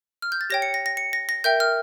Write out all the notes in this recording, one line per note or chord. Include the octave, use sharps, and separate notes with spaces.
F6
G6
A6
G4 C#5 G5 A#6
C#7
A#6
A#6
C#7
A#6
A#6
A#4 E5 G5 G6
F6